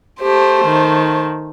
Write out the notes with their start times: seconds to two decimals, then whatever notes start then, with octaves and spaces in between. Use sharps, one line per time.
0.21 A3 G4 C5
0.65 D#3